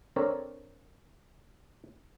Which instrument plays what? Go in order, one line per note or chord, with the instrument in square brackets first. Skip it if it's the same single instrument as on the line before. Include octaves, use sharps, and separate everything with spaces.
[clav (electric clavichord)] C4 D4 A4 A#4 C#5